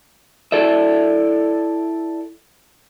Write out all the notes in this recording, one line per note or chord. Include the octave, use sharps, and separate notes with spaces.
E4 A4 D5 E5